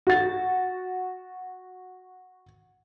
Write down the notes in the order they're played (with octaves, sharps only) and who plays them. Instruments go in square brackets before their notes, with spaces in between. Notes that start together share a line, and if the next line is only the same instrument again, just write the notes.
[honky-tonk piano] F#4 A6